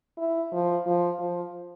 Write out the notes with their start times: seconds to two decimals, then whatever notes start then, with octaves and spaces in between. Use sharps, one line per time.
0.18 E4
0.52 F3
0.86 F3
1.19 F3